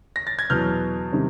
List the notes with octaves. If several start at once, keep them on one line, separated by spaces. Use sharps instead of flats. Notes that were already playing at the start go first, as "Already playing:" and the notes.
A#6
A6
G#6
E2 B2 F#3 F6 G6
C3 D#3 G3